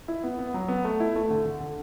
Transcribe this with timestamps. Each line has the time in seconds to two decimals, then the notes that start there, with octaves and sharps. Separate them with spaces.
0.08 E4
0.24 B3
0.39 B3
0.54 F#3
0.68 B3
0.85 A3
1.00 E4
1.16 A3
1.30 D3
1.45 D3
1.60 D3